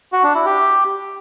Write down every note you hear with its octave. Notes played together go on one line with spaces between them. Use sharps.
F#4
D4
E4
G4